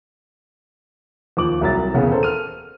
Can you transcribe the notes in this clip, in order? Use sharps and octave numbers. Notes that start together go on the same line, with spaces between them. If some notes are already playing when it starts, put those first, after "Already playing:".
D#2 F3 D6 F#7
C2 F#3 A#4 E5 A#5 A6
D#1 E2 C#3 B3 G#4
A4 A#4 C5
F6 D#7